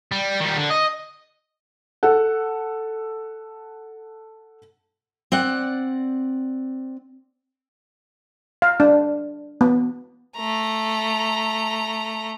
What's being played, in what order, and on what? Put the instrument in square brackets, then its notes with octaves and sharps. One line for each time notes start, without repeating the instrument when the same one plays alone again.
[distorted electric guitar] G3
D#3 G3
D3
D#5
[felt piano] A4 F#5
[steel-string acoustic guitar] C4 D5 F#5
[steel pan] F5
D4
B3
[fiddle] A3 A#5